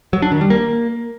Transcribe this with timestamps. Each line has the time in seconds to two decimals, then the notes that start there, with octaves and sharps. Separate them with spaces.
0.13 F#3
0.22 D4
0.32 D#3
0.41 G3
0.50 A#3